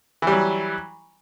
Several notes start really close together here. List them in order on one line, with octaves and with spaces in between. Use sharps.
E3 G3 F#3